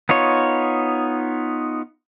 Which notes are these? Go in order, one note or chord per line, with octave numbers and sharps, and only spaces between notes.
B3 D#4 F4 C#5